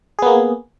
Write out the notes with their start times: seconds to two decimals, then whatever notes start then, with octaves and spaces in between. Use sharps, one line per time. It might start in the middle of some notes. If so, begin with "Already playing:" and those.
0.19 G#4
0.22 B3
0.26 A#3